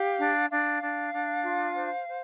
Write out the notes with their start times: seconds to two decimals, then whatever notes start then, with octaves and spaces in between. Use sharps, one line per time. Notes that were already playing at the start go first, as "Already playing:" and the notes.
Already playing: G4 F5
0.19 D4
0.50 D4 F5
0.82 D4
1.13 D4
1.44 F4
1.75 C5
2.07 C5